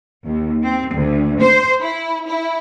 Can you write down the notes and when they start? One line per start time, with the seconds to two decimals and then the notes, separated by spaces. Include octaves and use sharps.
0.25 D#2
0.63 C4
0.94 D2
1.40 C5
1.81 E4
2.28 E4